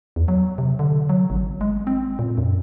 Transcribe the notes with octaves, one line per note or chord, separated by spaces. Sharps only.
E2
F#3
C3
D3
F#3
G#1
G#3
C4
A#2
F#2